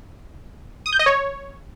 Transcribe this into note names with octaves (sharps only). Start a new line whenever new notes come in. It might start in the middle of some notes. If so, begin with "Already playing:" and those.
D#6
G6
D#5
C#5